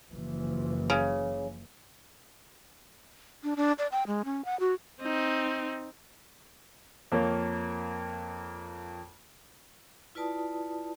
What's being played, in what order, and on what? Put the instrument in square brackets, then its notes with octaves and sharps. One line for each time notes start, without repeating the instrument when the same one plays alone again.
[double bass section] F#1 E3 F3
[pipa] C#3
[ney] D4
D4
D5
G5
G#3
C#4
F#5
F#4
[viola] C4 D#4
[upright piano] F2 A#3 A#4 C#5
[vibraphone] E4 F4 B4 D5 A5 D#6